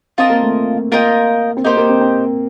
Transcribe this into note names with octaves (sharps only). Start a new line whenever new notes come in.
C4 F4 A#4 D#5 A5
A#3
A3
A#3 F4 A#4 D#5 G5
C4
A#3 D#4 G4 C5
A#3
C4
C4